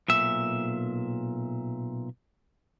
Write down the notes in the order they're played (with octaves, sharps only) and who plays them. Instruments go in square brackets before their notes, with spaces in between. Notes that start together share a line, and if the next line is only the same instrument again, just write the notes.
[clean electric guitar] B1 A#2 E5